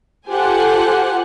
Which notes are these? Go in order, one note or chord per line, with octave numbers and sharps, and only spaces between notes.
F4 G4 A4 C5 F#5 G#5